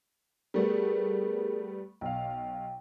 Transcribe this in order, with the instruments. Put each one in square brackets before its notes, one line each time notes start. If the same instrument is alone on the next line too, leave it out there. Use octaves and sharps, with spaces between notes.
[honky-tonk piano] G3 A3 B3 [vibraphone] G#4 A#4
[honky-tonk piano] B1 F5 [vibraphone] G5